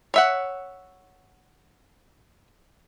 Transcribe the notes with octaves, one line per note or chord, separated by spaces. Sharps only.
C#5 E5 F#5